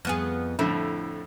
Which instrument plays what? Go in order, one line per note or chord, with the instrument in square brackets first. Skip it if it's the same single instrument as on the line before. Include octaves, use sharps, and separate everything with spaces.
[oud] F2 B3 G#4
[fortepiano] F2 A2 D3 [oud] E4